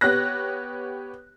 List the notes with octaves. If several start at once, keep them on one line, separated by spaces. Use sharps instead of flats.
B3 G4 C#5 F#6 A#6